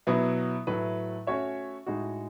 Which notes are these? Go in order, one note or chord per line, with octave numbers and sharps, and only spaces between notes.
B2 F#3 B3 E4
A2 F#3 A3 E4 B4
A3 C#4 F#4 C#5 E5
A2 G#3 D#4 F#4